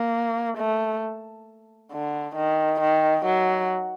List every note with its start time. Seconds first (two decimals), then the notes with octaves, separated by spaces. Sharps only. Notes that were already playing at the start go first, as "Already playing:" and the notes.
Already playing: A#3
0.58 A3
1.92 D3
2.36 D#3
2.81 D#3
3.26 F#3